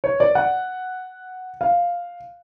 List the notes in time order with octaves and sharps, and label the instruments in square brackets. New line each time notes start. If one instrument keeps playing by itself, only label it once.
[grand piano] C#5
D5
F#5
F5